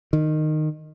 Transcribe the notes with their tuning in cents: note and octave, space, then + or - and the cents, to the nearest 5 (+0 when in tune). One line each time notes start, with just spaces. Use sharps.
D#3 -15